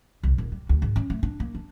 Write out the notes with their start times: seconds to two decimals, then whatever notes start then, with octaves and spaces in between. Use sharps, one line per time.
0.23 C2
0.38 D#1
0.52 G3
0.69 D2
0.82 G#2
0.96 C#4
1.10 A3
1.23 D4
1.40 A#3
1.55 D4